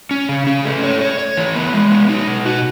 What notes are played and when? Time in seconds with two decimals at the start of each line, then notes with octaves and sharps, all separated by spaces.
0.11 C#4
0.29 C#3
0.47 C#4
0.65 A3
0.83 C#5
1.01 C#5
1.19 C#5
1.37 E3
1.55 B3
1.73 G#3
1.91 B3
2.09 D#4
2.28 B2
2.46 F#4